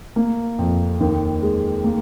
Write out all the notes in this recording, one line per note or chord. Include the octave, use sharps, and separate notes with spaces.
A#3
F2
D#2
G#3
A#3